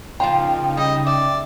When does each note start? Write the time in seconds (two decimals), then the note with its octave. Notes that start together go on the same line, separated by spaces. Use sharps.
0.20 C#3 F3 A#3 D#4 F4 G5
0.77 G3 D#5
1.07 D5 E5